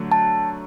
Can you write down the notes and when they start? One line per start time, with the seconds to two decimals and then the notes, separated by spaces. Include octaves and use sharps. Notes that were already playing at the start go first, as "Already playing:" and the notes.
Already playing: D3 F#3 A3
0.12 A5